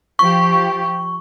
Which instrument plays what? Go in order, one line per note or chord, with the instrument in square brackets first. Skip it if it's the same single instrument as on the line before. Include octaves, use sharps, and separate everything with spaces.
[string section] F3 G4 [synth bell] C#6